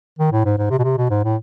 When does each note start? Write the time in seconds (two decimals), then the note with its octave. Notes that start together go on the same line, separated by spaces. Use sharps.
0.19 D#3
0.32 A2
0.45 G#2
0.58 G#2
0.70 C3
0.79 B2
0.84 C3
0.97 B2
1.10 G#2
1.24 A2